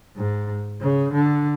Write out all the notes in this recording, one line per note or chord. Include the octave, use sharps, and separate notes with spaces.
G#2
C#3
D3